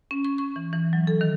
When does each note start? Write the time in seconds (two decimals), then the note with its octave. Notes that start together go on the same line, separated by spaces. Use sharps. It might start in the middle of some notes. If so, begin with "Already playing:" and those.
0.11 C#4
0.25 C#6
0.38 C#6
0.56 E3
0.73 E3
0.93 F#3
1.07 A4
1.21 D#3